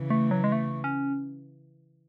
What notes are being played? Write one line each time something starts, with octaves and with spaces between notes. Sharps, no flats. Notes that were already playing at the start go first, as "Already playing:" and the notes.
Already playing: C#3 E3
A3
F#3
G#3
A3
C#4